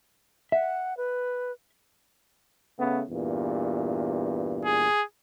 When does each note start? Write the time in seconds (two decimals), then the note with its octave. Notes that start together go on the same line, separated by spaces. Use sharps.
0.52 E5 F#5
0.97 B4
2.78 C#3 A3 B3
3.09 E2 G2 A#2
4.65 G#4